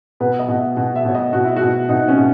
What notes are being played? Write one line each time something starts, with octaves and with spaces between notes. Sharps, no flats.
B2 B4
D#5
B2
E5
B2
E5
B2 C#5
D#5
B2 F#4
E4
F#4
B2
B2 D#4
C#4
B2